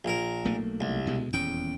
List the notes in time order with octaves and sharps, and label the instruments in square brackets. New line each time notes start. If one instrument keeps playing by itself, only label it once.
[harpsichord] A#1 A#4
[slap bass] B1 A3 A#3
[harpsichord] C2
[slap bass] D2 B2 G#3
[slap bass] D#1 E2 C#4 [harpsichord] G5